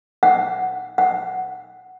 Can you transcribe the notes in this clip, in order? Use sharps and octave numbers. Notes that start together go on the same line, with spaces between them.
F#5
F#5